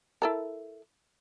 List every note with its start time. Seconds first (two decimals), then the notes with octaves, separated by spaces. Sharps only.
0.22 E4 A4 A#4